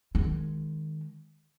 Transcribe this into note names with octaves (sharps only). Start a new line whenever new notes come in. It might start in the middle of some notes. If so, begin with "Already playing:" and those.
D#3 G#3